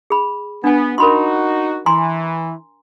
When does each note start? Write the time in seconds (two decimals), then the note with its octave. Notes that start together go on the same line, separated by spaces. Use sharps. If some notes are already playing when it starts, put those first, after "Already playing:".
0.10 G#4 B5
0.64 B3 D4 G#5
0.98 D#4 F#4 A#4 B5 C6
1.86 E3 G#5 A#5 C6